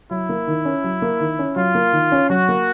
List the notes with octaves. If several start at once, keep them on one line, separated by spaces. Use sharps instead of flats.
F#3 E4
A#3
D#3
C#4
F#3
A#3
D#3
C#4
F#3 F4
A#3
D#3
C#4
F#3 F#4
A#3